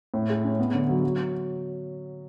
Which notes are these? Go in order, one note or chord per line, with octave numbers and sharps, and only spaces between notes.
A2
G#3
C#4
B3
D3
F#3
F#3